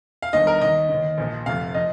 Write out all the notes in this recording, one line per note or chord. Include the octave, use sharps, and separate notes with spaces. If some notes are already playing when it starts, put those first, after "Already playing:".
F5
G1 G2 D#3 D#5
A#4
D#2 D#3 D#5
D#2 D#3
A#1 A#2 F3
F1 F2 C3 F5
F3 D#5